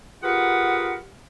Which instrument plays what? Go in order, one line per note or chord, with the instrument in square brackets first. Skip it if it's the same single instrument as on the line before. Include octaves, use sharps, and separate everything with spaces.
[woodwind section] F4 G4 G#4 A#4 B4 F#5